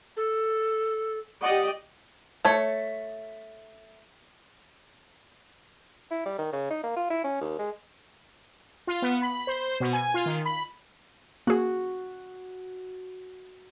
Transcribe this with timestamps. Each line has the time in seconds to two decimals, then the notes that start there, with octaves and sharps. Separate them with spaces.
0.17 A4
1.42 G4 D5 D#5 F#5
2.45 A3 C#5
6.11 E4
6.26 G3
6.39 D#3
6.53 C#3
6.71 D#4
6.84 A#3
6.97 F4
7.11 E4
7.24 C#4
7.41 D#2
7.59 G#3
8.87 F4
9.02 B3
9.22 B5
9.47 C5
9.80 B2
9.93 G#5
10.14 F4
10.26 D#3
10.45 B5
11.47 A#3 F#4 G#4